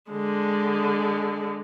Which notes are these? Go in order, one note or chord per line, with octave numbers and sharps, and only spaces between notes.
D3 G#3